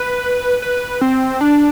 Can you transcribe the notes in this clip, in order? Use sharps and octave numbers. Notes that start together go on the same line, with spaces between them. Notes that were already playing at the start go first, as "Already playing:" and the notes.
Already playing: B4
B4
C4
D4